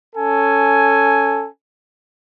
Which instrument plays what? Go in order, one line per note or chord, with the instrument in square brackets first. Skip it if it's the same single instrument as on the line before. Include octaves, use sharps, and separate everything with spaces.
[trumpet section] C#4 A4 G#5